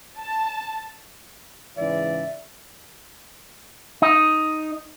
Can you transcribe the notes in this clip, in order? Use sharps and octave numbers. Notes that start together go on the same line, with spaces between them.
A5
G#2 C#3 E3 D5 E5
D#4